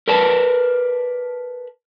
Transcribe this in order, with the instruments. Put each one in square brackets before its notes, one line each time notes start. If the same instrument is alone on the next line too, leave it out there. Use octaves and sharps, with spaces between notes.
[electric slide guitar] A#4 B4 D5 A5